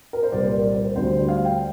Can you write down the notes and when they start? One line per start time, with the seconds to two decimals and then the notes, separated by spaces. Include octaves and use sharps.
0.13 A#4
0.23 C5
0.32 C2 A#2 G3 D5
0.54 A#4
0.74 C5
0.96 D2 D3 G3 D4 C5
1.29 F5
1.45 G5